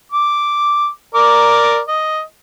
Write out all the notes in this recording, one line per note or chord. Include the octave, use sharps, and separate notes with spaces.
D6
A#4 D5 D6
D#5